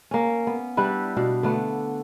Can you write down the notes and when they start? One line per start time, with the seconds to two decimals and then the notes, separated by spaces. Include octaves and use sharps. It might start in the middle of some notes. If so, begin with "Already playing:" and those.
0.11 A#3 C#4
0.47 B3
0.77 G3 D4 E4 B4
1.16 B2 D4 F5
1.43 D3 A3 B3